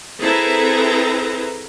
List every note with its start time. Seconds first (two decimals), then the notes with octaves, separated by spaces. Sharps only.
0.19 C4 E4 G#4 A4 B4 A#5